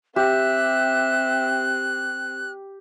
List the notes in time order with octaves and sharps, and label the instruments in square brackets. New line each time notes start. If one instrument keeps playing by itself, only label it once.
[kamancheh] C4 [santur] G4 [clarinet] E5 [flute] F#6